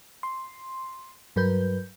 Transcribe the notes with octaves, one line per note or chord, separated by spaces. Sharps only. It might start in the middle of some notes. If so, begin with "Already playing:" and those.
C6
G2 F#3 A#4 B4 G6